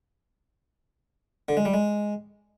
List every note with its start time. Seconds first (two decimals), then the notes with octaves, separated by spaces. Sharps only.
1.49 D3
1.57 G#3
1.65 G3
1.74 G#3